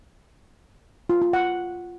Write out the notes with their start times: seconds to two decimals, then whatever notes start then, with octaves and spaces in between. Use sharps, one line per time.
1.10 F4
1.21 F4
1.33 F#5